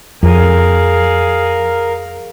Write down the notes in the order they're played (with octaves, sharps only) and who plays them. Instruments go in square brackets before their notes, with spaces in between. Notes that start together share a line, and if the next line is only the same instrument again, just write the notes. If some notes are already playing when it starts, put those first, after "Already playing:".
[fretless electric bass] F2 [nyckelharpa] G#4 F5 [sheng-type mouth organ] A#4